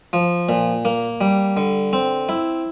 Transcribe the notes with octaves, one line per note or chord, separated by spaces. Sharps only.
F3
A#2
A#3
G3
D3
C4
E4